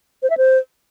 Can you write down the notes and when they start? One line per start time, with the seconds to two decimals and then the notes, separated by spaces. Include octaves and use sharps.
0.23 C5
0.30 E5
0.37 C5